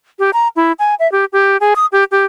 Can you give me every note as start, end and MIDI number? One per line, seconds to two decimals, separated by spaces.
0.19 0.31 67
0.33 0.48 82
0.56 0.72 64
0.79 0.95 80
1.00 1.10 76
1.12 1.25 67
1.33 1.57 67
1.61 1.74 68
1.76 1.86 87
1.92 2.04 67
2.11 2.25 67